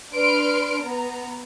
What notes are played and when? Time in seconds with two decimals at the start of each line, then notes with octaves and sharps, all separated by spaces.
0.14 D4 B4 C6 F6 D7
0.83 B3 A#5